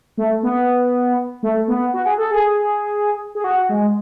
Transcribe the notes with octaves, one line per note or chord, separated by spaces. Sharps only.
A3
B3
A3
B3
F#4
G#4
A4
G#4
G#4
F#4
G#3